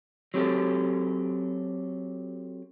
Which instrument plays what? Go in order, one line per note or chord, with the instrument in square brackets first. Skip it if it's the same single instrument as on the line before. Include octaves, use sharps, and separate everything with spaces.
[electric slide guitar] F#3 C4 G4 A4